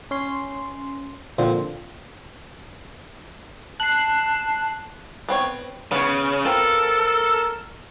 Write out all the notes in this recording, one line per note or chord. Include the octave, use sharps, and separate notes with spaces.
C#4 C6
A#2 D3 F3 C4
A5 F#6 C7
B3 C4 C#5
C#3 B3 C#5
B3 C4 F4 A4 A#4